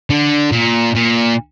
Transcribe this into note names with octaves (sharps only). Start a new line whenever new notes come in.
D3
A#2
A#2